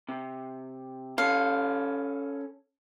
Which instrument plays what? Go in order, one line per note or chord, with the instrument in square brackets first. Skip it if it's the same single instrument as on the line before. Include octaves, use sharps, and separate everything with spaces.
[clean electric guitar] C3
[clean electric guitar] C#4 A4 [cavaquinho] F5